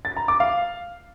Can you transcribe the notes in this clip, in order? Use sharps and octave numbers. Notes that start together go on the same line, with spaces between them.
A6
A#5
D6
F5